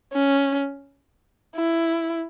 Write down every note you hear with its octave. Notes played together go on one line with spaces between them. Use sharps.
C#4
E4